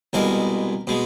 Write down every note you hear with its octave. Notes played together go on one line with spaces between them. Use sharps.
C2 B2 G#3 A#4
B2 G#3